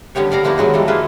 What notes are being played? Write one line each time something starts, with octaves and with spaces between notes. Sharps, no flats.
D3 G3 B3 G4 C#5
G3 D5 F5 A#5
D3 F3 A#3 B3 D#4 E4
B2 D#3 F#3 G#3 F#4
E3 G3 A4
G#3 A#3 E4 F4 A4 B4